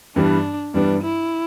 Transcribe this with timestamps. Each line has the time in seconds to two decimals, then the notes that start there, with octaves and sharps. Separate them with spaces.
0.16 G2 E3 G3 B3 D4
0.74 G2 E3 G3 B3 D4
1.03 E4